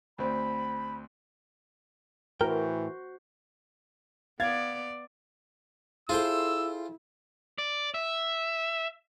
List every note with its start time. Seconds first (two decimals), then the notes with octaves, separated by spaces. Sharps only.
0.19 D2 C4 B5
2.41 A2 E3 F#4 A#4 C5 G5
4.40 B3 D5 F5 G#6 A6
6.09 E4 F4 G#4 A4 C5 G5 E6
7.58 D5
7.94 E5